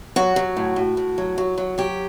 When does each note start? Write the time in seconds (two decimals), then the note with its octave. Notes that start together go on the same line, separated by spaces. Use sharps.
0.16 F#3 F#4
0.36 F#3
0.57 A2
0.76 A2
0.97 A2
1.18 F#3
1.38 F#3
1.58 F#3
1.78 F#3 G4